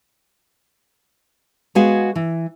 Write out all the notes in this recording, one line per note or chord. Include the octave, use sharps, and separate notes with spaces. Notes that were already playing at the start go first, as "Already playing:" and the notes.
G#3 B3 F#4 G#4 F5 G#5
E3